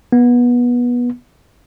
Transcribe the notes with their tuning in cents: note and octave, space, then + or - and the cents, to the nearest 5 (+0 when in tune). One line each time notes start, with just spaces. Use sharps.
B3 -20